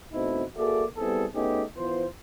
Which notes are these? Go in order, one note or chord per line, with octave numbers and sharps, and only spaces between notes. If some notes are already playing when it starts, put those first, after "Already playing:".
B2 A3 C4 D#4 E4
A#3 F#4 G#4 A4 D5 E5
G3 B3 C4 E4 G#4 A4
A3 B3 C#4 D#4 G4 G#4
E3 B3 F4 C5